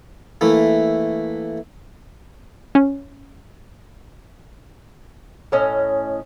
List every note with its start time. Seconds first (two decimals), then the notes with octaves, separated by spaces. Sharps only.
0.41 E3 A3 A#3
2.75 C#4
5.52 A2 C#4 D#5